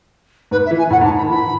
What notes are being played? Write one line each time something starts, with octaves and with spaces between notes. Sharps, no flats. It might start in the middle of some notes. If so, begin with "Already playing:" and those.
G#2 B4
E5
E3
G#5
A2 F#5
G#2
A5
B5
D#3
E3 B5